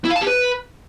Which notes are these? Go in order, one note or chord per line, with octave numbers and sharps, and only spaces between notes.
E4
F5
A5
G4
B4